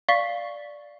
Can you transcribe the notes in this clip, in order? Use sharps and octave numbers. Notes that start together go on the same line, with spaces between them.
D5 F5 C#6 B6 G7